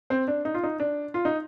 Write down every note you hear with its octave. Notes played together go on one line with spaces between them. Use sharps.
C4
D4
D#4
F4
D#4
D4
F4
D#4